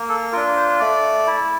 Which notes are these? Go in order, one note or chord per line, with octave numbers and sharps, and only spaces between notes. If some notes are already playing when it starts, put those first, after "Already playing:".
Already playing: A#3
A4
D4 F4 A#4
C5
A3 D5
E4